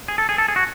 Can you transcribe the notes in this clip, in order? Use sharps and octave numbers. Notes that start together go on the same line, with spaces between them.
G#4
A4
G#4
A4
G#4
F#4